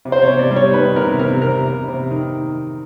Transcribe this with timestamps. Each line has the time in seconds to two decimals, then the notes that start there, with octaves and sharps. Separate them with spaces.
0.05 C3
0.12 C5
0.22 C#5
0.28 C3
0.39 D5
0.51 G3
0.56 C#5
0.74 D#3 B4
0.96 C3 A#4
1.19 C3 A#4
1.42 C3 A#4
1.65 C3
1.88 C3
2.11 D#3